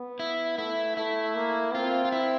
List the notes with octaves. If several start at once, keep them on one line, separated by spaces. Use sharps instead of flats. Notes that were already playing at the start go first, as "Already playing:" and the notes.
Already playing: B3
E4
A3 E4
A3 E4
A#3
C4 F4
F4
E4